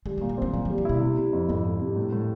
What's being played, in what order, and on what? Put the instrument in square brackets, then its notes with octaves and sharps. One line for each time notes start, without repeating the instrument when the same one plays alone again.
[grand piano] G3 [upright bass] G#3
[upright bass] G#3
[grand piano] A#2
[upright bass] G#3
[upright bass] G3 [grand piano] C4
[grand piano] A#2 [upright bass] F#3
[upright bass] F3
[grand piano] G3
[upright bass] F3
[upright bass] B2 [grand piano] E4
[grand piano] C3
C3
F2
[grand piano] F2 [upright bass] G#2
[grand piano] F2
C3
A2
A2